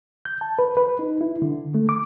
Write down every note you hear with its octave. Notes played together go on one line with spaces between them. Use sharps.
G6
A5
B4
B4
D#4
E4
D3
A3
D6